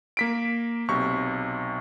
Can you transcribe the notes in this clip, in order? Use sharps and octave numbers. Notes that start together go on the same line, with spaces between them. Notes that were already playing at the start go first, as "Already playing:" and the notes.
A#3 B6 D7
B1 C3 C#6